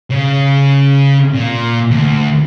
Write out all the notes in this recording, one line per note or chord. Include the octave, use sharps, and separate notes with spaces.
C#3
A#2
D2